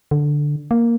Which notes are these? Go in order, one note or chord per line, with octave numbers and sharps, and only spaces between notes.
D3
A#3